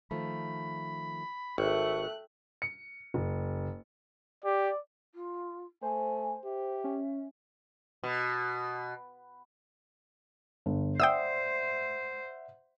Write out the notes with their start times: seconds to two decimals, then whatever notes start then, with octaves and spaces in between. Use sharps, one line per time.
0.11 D#3 F3 A3 B5
1.58 G#1 A3 G5 C#6 F#6
2.62 C#7
3.14 F#1
4.45 G4 D5
5.14 F4
5.82 A3 C5 G#5
6.44 G4 E5
6.84 C#4
8.03 B2
10.66 G1
11.00 C5 D5 E5 F#5 G5 D#6 E6